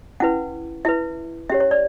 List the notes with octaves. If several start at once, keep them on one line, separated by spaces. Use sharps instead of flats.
C#4 E4 B4 F#5
E4 B4 E5
C#4 G4 C#5 E5
C#5
D5